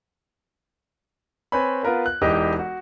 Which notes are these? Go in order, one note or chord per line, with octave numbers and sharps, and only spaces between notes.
C4 B4 C#5 G#5 B5
B3 F4 A#4 B4
F#6
E1 E3 D#4 G4 D#5
F#4